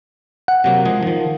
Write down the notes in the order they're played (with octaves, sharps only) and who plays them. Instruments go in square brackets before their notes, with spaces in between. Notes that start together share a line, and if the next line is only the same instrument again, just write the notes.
[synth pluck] F#5
[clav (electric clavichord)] C3 F#3 A#3
F3 G#3 G#4
D#3 F3